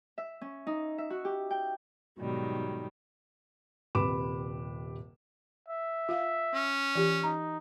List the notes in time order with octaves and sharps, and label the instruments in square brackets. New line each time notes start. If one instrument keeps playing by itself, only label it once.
[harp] E5
C#4
D#4
E5
F#4
G4
G5
[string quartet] G#2 B2 D#3 F#3 G3
[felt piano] D#1 C3 B4 B5 D6 E7
[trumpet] E5
[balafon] F4 F5
[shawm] C#4
[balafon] E3 F4 G4
[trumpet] D#4 [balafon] A#5